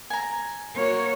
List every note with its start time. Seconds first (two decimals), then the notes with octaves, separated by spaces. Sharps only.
0.10 G#5 A#5
0.75 A#3 F#4 C#5